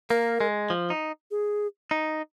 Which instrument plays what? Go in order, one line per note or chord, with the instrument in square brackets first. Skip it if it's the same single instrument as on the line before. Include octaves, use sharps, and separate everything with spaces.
[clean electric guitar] A#3 [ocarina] A#4
[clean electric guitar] G#3
F3
D#4
[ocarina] G#4
[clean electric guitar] D#4